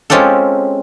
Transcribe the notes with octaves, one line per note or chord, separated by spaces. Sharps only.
G#3 C4 C#4 F4 G4 A4